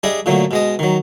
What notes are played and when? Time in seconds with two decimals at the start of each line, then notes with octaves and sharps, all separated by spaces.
0.03 G3 D4 G#4 D#5 E5
0.26 A#2 D3 F#3 A3
0.51 B2 G#3 D#5
0.79 D#3 F#3